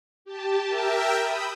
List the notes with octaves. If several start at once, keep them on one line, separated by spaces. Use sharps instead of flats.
G4 A5
A#4 E5 G5
B5 D#6 E6 G6